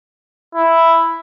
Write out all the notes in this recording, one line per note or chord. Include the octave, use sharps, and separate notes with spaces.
E4